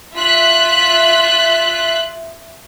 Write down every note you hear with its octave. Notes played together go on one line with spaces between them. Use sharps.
F4 E5 F#6 B6